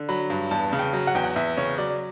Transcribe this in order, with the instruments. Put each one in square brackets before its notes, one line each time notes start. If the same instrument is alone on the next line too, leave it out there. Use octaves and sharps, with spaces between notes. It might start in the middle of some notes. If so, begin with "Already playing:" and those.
Already playing: [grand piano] D3
F#3 B5
G2
E2 A5
C#3
G5
F#3
F#5
E2 G5
F#5
E2 E5
C#3 C#5
F#3 D5